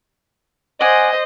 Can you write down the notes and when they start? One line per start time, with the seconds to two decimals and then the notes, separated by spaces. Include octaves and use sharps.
0.81 C5 D5 D#5 F#5 G#5